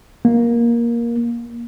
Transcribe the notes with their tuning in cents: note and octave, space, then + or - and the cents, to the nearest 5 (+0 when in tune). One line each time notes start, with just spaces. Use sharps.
A#3 +10